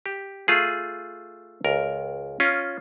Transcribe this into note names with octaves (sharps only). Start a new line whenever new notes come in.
G4
A3 F4 G#4
C#2 A#4
C#4 F4